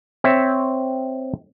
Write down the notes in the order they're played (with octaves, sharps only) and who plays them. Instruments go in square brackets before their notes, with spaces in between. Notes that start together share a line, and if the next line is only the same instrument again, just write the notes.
[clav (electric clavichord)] C4 C#5 E5